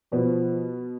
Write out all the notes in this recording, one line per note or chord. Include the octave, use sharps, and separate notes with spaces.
B2 F3 B3